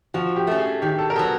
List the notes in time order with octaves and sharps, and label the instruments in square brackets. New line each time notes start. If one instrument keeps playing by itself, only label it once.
[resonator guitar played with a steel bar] F3 [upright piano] F#4
[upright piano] G4
[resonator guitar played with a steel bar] A3 C#4
[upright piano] G#4
[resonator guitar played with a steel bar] D#3 [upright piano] G4
[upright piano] A4
A#4
[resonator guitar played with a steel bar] F#3 B3 [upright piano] A4